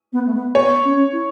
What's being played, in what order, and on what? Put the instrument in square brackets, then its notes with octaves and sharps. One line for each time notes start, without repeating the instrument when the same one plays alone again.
[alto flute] B3
A3
B3
[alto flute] B3 [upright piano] C#5
[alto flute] C#4
E4